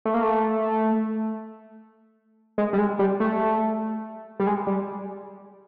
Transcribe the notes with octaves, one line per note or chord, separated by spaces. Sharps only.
A3
A#3
A3
G#3
G3
G#3
G3
A3
G3
G#3
G3